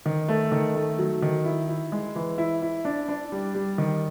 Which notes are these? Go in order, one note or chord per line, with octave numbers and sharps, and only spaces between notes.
D#3
A3
D#3
A3
F#3
D#3
E4
E4
G#3
E3
E4
E4
D4
D4
G3
G3
D#3